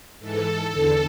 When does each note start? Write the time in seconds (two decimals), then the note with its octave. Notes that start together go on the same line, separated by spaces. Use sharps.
0.20 G#2 E3 A4
0.71 E2 D3